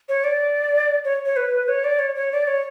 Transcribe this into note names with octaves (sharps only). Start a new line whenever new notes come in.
C#5
D5
C#5
C#5
B4
C#5
D5
C#5
C#5
D5
C#5